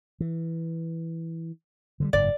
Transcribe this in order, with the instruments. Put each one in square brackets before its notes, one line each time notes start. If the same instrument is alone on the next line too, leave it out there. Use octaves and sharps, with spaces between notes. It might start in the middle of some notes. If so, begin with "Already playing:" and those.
[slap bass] E3
D3 F#3 G3
[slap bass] F#1 G#2 [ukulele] D5